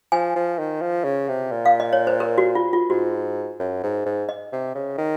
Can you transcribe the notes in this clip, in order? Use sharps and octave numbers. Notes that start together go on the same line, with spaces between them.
F3 G#5
F3
D#3
F3
C#3
C3
A#2
F5
D#5
C#5
C5
A#4
F#4
F4
F4
G#2 F#4
F#2
G#2
G#2
D#5
C3
C#3
D#3